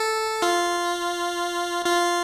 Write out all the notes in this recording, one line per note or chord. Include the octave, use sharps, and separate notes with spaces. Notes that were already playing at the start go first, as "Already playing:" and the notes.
Already playing: A4
F4
F4